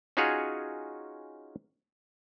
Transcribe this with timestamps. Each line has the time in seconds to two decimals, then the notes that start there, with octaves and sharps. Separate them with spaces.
0.17 C#4 D#4 F4 F#4 G#4 C#5